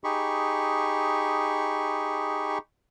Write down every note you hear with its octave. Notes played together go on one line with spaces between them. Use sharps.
D#4 G4 G#4 B5 C#6